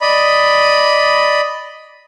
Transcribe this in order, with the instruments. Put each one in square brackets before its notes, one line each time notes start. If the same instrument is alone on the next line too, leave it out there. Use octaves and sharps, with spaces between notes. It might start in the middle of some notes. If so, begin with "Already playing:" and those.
[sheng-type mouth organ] D5 D#5 B5